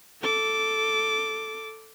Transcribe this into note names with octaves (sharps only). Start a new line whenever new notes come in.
A4 D6